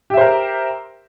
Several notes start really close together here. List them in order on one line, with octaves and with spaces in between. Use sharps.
G4 E5 C5 A#4